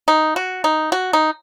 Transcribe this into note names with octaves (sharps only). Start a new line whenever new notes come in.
D#4
F#4
D#4
F#4
D#4